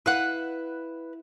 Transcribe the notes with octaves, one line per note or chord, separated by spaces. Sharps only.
E4 B4 F5 F#5 F#6